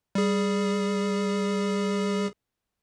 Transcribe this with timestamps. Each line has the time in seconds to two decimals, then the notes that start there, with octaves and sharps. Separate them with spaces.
0.15 G3 G#4